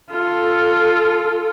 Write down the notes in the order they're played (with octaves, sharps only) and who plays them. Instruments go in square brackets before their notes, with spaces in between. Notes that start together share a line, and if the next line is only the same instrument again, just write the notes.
[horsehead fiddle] F4 A4